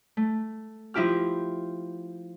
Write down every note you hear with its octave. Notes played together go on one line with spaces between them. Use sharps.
A3
F3 E4 G4 F6